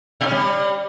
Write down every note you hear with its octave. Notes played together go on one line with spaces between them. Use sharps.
B2
C#4
G3